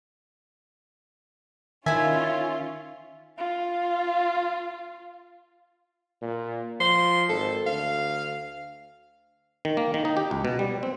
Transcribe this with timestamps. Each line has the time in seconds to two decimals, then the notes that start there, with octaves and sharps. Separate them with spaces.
1.86 D#3 C#4 E4 F4 E5 G#5
3.38 F4 F5
6.22 A#2
6.80 F3 C6
7.29 G#1 A4
7.66 D2 F5
9.65 D#3
9.77 A#3
9.94 D#3
10.05 D#4
10.17 G4
10.31 C#2
10.45 B2
10.59 G3
10.83 C4